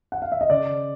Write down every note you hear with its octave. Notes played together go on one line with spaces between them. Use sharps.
F#5
F5
E5
D#5
C#3 D5